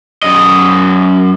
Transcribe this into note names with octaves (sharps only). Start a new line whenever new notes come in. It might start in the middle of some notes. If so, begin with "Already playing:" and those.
F#2 D#5